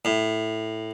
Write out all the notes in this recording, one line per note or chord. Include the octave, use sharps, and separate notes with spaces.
A2